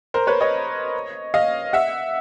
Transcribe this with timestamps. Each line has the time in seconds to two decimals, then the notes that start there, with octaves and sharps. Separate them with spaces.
0.14 A#4 C5
0.27 B4 C#5
0.41 C#5 D#5
1.34 D#5 F5
1.73 E5 F#5